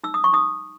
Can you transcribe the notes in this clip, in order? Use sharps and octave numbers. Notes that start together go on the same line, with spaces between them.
D#4 E6
D#6
C#6
D#4 D#6